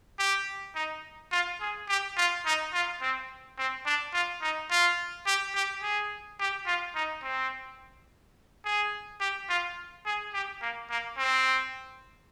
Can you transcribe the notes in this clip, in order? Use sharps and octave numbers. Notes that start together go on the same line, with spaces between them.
G4
D#4
F4
G#4
G4
F4
D#4
F4
C4
C4
D4
F4
D#4
F4
G4
G4
G#4
G4
F4
D#4
C4
G#4
G4
F4
G#4
G4
A#3
A#3
C4